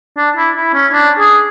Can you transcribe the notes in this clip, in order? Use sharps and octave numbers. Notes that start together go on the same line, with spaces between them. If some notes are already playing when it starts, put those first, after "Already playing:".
D4
E4
E4
C#4
D4
G#4